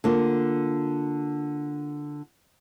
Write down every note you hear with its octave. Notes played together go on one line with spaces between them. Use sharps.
D3 A#3 F4